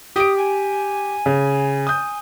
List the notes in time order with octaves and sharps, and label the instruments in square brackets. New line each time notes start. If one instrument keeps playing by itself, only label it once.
[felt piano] G4 D7 [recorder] D#6
[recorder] G#5
[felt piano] C#3
D#6 G6